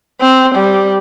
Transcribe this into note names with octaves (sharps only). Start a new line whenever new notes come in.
C4
G3